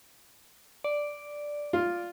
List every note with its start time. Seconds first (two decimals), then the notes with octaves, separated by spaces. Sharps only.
0.84 D5
1.73 F4